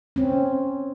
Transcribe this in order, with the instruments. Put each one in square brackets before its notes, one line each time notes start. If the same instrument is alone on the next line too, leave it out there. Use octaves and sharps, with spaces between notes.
[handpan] C4 C#4